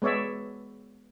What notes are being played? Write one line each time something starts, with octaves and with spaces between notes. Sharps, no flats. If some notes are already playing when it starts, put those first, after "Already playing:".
G#3 B3 C#5 D5 E5